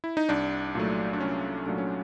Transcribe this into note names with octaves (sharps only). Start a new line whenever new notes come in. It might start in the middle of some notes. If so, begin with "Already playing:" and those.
E4
D#4
C2 D4
A#2 F#3 A3
D4
C2 C#4
A#2 F#3 A3 D4
C#4